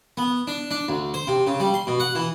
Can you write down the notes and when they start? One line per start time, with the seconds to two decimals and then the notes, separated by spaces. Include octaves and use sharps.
0.17 B3
0.47 D4
0.71 D4
0.89 D2
1.14 C5
1.27 C3
1.47 C#3
1.60 G3
1.74 C6
1.87 B2
2.00 F#5
2.15 E3